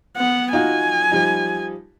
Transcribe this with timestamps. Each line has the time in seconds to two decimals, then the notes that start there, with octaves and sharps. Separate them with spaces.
0.16 B3 F#5
0.53 D#4 F4 F#4 G#5
1.11 F3 G3 D#4